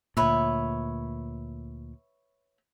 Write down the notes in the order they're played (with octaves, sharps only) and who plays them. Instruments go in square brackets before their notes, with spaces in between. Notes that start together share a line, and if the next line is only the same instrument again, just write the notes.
[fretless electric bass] D2 A#2 [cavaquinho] B4 C#5 E5